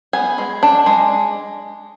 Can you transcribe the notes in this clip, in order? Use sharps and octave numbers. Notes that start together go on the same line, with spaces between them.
B3 G#5
G#3
D4
G#3